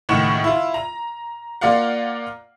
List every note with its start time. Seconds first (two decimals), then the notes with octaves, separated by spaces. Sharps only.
0.09 C#2 A2 D#3 F#5 C#6 E7
0.44 E4 F4
0.74 A#5
1.61 A#3 F4 D5 F5 F#5